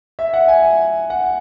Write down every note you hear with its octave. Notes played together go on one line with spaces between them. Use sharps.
E5
F#5
G#5
F#5